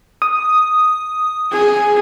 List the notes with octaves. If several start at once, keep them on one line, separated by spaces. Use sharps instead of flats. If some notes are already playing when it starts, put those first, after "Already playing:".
D#6
G#4